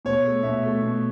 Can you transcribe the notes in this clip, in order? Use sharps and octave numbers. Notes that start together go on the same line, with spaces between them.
B2 C#5
A3
B2 E5
A3
B2